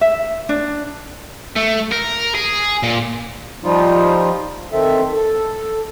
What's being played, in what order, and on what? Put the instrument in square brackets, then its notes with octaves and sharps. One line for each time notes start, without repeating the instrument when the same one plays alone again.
[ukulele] E5
D4
[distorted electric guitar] A3
A#4
G#4
A#2
[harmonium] F3 G3 D#4 F4
D#3 C4 A4 E5
A4